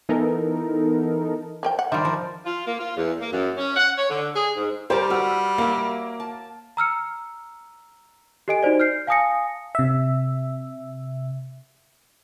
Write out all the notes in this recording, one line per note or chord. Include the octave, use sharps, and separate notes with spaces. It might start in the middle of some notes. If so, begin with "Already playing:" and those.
E3 B3 D#4 A4 A#4
F3 A#4 G5
F#5
D#3 G3 A#4 C5 D5 E5
F3
F4
A#3
F4
E2
A#3
F#2
C#4
F#5
C#5
D3
G#4
G#2
G3 G4 A#4 C5 A5
F#4 B4 E6 F6
A#3 C#5 E5
A5
A#5 E6 F6 C#7
G4 A4 D#5 G#5 D7
D#4 F#4 C5 D5
F6 G6 C7
F5 G#5 A5 D#6 A#6 C#7
C3 E5